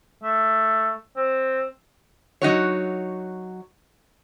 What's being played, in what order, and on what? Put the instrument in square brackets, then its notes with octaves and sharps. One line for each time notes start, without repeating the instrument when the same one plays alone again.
[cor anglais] A3
C4
[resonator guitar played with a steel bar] F#3 D#4 F#4 C#5